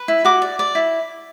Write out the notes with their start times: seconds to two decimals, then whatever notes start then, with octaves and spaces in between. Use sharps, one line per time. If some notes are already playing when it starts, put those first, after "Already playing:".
Already playing: B4
0.08 E4
0.25 F#4 D6
0.42 D5
0.59 D5
0.75 E4